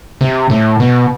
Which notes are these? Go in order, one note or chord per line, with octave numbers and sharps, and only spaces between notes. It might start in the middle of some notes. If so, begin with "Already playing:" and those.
C3
A2
B2